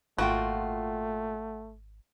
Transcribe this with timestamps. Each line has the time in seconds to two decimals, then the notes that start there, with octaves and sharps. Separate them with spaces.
0.18 G#1 A#2 A3 F4 F#4 G5